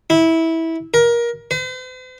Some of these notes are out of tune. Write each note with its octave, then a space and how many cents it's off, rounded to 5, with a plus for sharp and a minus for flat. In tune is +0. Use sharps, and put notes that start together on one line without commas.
E4 -15
A#4 +20
C5 -45